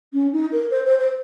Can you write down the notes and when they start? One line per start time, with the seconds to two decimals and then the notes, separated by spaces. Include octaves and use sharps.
0.13 C#4
0.33 D#4
0.51 A#4
0.71 C5
0.85 C5
0.99 C5